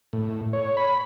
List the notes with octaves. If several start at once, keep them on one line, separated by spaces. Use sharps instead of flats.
A2
C#5
B5